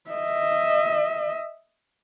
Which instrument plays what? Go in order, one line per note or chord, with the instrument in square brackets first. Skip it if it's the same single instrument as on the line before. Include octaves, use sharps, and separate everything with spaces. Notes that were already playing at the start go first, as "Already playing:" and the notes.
[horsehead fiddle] D#5 E5